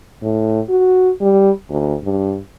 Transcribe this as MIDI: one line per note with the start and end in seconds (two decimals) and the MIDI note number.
0.22 0.60 45
0.69 1.10 66
1.21 1.50 55
1.70 1.95 38
2.04 2.39 43